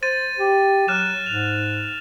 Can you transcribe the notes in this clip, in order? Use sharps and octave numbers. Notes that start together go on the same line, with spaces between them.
C5 A6 D#7
G4
F#3 F6 F#6 E7
G#2 F7